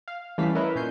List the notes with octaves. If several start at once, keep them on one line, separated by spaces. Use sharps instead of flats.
F5
E3 G3 A3 C#4 F5 B6
E4 A#4 B4 C#5 D#5 E5
A#2 C#4 G6 C7